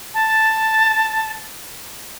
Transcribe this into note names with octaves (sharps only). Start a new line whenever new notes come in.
A5